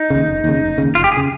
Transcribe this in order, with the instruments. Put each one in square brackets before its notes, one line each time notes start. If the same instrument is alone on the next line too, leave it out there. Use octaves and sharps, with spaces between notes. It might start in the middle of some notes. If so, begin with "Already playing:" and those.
Already playing: [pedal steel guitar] D#4
[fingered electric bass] D#2 C#3
F1
D#2 C#3
F1
D#2 C#3
[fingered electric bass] F1 [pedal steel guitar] F4
[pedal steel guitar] G4
G#4
[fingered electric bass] C#3